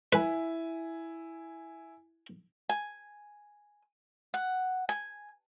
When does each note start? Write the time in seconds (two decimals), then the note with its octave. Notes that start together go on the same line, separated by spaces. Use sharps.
0.13 E4 B4 G#5
2.69 G#5
4.34 F#5
4.89 G#5